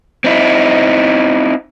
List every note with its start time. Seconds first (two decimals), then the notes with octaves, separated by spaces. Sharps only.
0.24 C4 D#4 E4